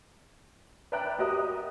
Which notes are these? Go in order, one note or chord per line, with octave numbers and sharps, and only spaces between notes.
B4 D5 E5 G5 A#5 F#6
F#4 G4 A#4 D#5 E5 D#6